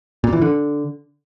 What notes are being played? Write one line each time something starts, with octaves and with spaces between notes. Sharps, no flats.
A#2
E3
D3